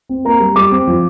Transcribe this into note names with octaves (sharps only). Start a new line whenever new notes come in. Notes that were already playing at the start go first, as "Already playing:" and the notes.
C4
A#3 A#5
G3
G3 D6
C4
F3